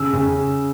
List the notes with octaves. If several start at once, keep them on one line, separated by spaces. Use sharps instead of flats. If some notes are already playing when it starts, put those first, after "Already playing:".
Already playing: C#3 E6
C#3